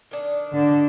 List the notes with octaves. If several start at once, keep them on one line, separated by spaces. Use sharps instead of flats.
D#3 D4
D3